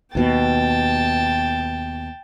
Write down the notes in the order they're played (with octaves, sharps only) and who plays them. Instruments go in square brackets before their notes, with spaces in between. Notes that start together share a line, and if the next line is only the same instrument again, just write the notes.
[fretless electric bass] D#2 B2 [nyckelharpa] G5 A5